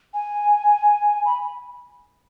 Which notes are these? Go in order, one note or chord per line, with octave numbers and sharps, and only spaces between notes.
G#5
B5